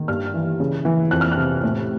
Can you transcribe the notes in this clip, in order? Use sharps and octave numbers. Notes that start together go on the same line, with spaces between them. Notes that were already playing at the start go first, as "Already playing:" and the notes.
Already playing: D#3
G2 F6
E3
C#3
E3
F2 F#6
F6
F#6
C3
A2